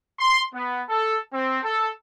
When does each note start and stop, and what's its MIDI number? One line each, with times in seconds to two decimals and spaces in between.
0.18 0.41 84
0.53 0.80 59
0.88 1.16 69
1.32 1.58 60
1.62 1.88 69